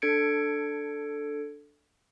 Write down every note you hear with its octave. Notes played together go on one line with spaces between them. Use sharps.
D4 A4 G#6 C#7 D7